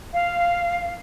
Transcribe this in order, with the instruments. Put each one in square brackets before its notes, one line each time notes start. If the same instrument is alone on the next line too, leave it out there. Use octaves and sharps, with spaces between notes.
[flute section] F5